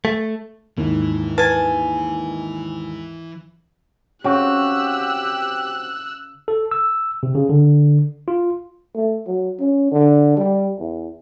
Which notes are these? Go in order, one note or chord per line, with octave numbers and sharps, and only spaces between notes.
A3
D#2 G#2 E3
B4 G#5 A5
C#3 C4 F#4 G4 E6 F#6
A4
E6
C3
C#3
D3
F4
A3
F#3
C#4
D3
G3
E2